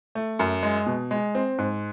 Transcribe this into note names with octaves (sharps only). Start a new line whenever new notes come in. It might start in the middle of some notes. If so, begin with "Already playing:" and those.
A3
F#2
G#3
B2
G#3
C4
G#2